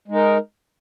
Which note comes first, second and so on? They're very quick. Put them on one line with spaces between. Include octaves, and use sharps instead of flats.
G#3 D#4 A#4